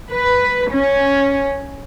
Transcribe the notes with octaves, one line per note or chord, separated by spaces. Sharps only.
B4
C#4